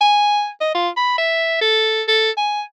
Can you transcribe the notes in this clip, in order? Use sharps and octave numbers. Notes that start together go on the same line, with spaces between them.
G#5
D#5
F4
B5
E5
A4
A4
G#5